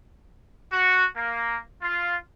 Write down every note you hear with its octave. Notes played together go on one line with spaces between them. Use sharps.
F#4
A#3
F4